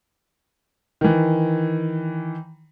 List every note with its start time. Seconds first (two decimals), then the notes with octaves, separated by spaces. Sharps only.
1.01 D#3 E3